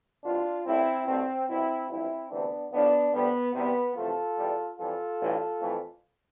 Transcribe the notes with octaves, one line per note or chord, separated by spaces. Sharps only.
C2 B2 G3 D4 F4
A1 A2 G3 C4 E4
C2 B2 A3 C4
C2 B2 G3 C4 E4
A1 G2 F3 C4 E4
D2 C3 E3 A3 B3 D4
B1 A2 F3 B3 D4
D2 D3 G3 B3
E2 C3 G3 B3
E2 C3 F3 A3 F4 A4
E2 B2 G3
F2 E3 G3 F4 A4
A1 G2 E3 G3
F2 E3 A3